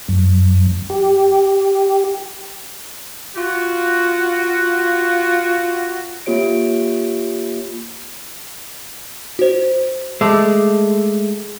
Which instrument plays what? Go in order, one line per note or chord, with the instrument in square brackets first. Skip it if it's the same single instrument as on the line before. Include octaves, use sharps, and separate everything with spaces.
[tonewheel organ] F#2
G4
[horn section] F4 F#4
[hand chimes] A#3 F4 G4 C#5 D7
[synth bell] F#4 C5
[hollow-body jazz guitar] G#3 A3 [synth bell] A5 D6 E6